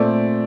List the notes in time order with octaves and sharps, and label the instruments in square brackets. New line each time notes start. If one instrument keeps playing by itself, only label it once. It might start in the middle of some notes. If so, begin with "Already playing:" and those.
Already playing: [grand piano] A#2 A3 C4 D5